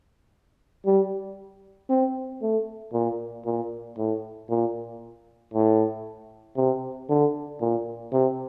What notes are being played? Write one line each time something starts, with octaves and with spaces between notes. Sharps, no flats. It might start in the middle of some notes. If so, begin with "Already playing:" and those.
G3
C4
A3
A#2
A#2
A2
A#2
A2
C3
D3
A#2
C3